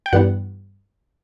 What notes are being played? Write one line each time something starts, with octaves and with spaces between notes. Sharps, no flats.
G5
G2 E3 G3 B3 F#5